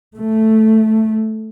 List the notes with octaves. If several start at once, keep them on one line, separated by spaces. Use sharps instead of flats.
A3